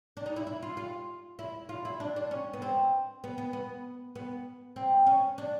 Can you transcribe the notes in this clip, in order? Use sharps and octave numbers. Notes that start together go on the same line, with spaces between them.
D4
D#4
E4
E4
F4
F4
E4
F4
E4
D4
D4
C#4
B3
C4
B3
B3
B3
B3
C4
C#4
D4